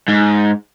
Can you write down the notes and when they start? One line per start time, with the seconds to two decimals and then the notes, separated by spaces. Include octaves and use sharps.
0.08 G#2